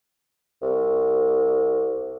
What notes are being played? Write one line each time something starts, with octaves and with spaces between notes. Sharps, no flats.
C2